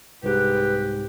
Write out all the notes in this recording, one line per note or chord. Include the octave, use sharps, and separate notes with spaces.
C2 G#2 G4 B4